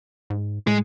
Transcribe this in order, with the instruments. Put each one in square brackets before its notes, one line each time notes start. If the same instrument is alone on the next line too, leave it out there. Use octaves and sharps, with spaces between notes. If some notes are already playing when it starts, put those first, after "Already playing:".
[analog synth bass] G#2
[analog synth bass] A2 [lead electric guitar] G#3